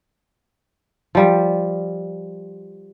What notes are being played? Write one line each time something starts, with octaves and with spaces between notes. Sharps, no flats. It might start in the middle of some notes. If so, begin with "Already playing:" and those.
F3 G3